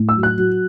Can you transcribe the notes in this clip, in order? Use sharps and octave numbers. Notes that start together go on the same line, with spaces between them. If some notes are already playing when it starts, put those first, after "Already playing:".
Already playing: A2
E6
F#3
F#6
F#3